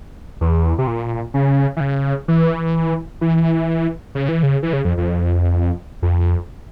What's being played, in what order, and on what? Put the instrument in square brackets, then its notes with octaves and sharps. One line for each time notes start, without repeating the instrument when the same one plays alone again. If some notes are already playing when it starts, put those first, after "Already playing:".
[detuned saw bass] E2
C3
A#2
C#3
E3
C#3
E3
E3
C#3
E3
C#3
E3
C#3
F2
F2
F2